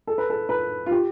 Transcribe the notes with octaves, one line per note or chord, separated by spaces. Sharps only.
A4
B4
A4
B4
F4
G4